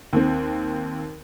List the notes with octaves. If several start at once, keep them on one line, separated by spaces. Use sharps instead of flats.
D#2 C4